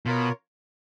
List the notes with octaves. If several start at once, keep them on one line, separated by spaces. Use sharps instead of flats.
B2 F4 A#4 C#5